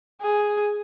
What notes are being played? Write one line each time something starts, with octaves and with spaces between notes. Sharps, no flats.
G#4